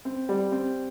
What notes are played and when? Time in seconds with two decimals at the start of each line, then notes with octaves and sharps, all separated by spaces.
0.05 C4
0.29 G3
0.52 C4